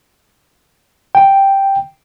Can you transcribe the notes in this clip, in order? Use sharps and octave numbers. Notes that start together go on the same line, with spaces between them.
G5